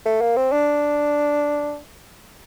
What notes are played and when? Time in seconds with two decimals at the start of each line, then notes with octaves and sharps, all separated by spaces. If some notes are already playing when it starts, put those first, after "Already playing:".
0.05 A3
0.21 A#3
0.37 C4
0.52 D4